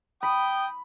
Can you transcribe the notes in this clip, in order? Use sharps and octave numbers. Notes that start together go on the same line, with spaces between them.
G5 B5 D#6